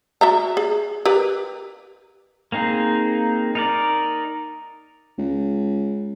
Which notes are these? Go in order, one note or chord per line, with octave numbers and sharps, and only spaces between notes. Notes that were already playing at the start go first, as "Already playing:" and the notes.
F#4 E5 A#5
G#4
G4 A#4 B4
A#3 C4 D#4 G#4
D#4 A#4 D5
C#2